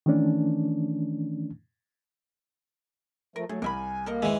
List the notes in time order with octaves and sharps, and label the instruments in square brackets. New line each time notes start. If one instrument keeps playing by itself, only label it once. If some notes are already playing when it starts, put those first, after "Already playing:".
[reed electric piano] D#3 E3 A3 C#4 D4
[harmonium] F3 A3 [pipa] A#4
[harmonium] F#3 [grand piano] A3 [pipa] G#4
[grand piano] C2 [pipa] A#4 E5 B5 [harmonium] G#5
[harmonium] A#3 [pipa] A4 A#4 D#5
[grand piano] G#1 [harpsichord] E3 G#3 [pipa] E5